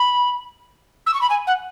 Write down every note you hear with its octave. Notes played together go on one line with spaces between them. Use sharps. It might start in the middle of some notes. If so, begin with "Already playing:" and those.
Already playing: B5
E6
C#6
B5
G#5
F#5